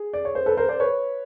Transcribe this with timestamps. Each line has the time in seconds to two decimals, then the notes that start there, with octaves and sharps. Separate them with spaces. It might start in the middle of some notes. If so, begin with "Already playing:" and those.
Already playing: G#4
0.13 D5
0.25 C#5
0.35 C5
0.46 A4 B4
0.57 A#4 C5
0.69 C5 D5
0.80 B4 C#5